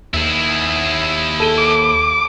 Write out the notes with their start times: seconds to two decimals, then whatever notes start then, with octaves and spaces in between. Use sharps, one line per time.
0.14 D#2 E4 G#4
1.40 A4 D#7 G7
1.58 D6